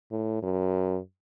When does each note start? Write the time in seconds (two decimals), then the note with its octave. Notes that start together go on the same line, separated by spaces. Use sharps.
0.11 A2
0.43 F#2